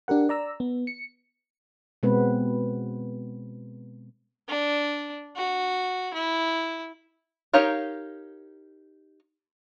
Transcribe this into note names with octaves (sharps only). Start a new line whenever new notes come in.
D4 G4 A#4 F#5
D5 A#5 E6
B3
C#7
B2 G#3 B3 C4 B4
D4
F#4
E4
D#4 G4 A#4 C#5 F5